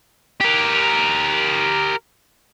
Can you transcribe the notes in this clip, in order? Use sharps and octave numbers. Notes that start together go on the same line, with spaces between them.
G4 A#4